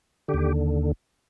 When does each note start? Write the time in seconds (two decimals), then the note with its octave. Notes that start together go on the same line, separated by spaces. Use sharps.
0.28 D3 G4
0.34 D#2